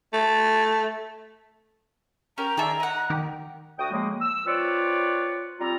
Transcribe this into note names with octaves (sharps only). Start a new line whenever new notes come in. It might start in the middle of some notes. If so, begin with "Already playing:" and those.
A3
C#4 G4 A#4 A#5
D#3 G#4 A4 D5 E5
D#5 F#5
D#3 G4
D2 F#4 G5 D#6
C#3 F3 G#3 A#3
E6
C4 F4 B4 C#5 D5
G3 C4 F4 A#5